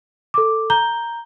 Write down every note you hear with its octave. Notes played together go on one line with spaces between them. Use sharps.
A4 D6
A#5 G6 G7